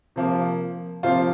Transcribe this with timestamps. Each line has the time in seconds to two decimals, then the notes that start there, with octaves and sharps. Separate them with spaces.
0.16 C3 F3 A#3
1.03 C3 F3 A#3 F4